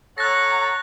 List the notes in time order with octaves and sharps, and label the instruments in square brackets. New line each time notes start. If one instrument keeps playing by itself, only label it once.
[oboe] A4 [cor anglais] C#5 [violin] F#5 A#5 [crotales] F#6 A#6